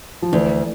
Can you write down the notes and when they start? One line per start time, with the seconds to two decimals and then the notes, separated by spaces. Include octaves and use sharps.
0.22 F3
0.32 D2 E3